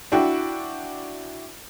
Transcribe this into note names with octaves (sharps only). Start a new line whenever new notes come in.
D4 E4 F#4 G5